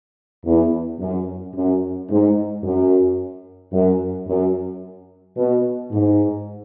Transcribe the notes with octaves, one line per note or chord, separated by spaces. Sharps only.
E2
F#2
F#2
G#2
F#2
F#2
F#2
B2
G#2